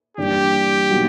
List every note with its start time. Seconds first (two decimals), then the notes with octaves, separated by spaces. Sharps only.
0.17 G2 E3 G3 A#3 D4 G4
0.90 B2 F#3 A#3 D#4 F#4